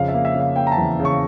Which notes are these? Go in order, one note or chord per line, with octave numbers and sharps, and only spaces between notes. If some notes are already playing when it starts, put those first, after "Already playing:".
Already playing: F2 C#3 F5
E5
A#3
E5
C#3 F5
A#3 G5
A#5
A5
E2
C#3
C#6